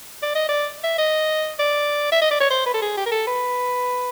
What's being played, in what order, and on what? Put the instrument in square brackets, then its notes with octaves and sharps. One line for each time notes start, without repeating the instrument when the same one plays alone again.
[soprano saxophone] D5
D#5
D5
E5
D#5
D5
E5
D#5
D5
C#5
C5
B4
A4
G#4
G4
A#4
A4
B4